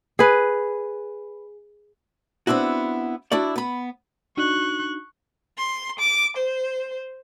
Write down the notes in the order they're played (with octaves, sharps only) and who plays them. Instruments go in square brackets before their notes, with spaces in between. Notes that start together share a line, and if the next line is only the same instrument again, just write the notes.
[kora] G#4 B4
[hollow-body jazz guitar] B3 C4 D4 E4 F#4
D4 E4 F#4 D5
B3 B5
[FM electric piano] D4 D#4 F#4 [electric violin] C#6 F#6
[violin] C6
D6
C5